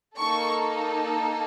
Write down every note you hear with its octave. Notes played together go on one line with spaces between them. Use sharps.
A#3 D#4 A4 C#6